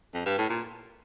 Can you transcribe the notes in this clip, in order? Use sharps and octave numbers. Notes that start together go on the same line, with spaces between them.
F2
G2
A2
A#2